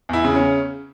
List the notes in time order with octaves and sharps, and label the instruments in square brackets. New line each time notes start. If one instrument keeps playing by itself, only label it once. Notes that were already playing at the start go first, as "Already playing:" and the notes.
[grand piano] E2 E4
C#3
C#4